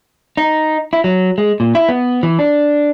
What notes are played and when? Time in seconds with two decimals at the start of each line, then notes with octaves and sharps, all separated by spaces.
0.37 D#4
0.93 E4
1.04 F#3
1.38 G#3
1.60 A#2
1.75 E4
1.89 B3
2.23 E3
2.39 D4